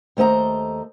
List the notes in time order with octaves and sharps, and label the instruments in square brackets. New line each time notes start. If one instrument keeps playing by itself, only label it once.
[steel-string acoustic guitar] D#2 A3 C5 D#5 A#5